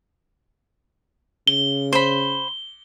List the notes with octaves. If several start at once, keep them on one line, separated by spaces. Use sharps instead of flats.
C#3 G7
C5 B5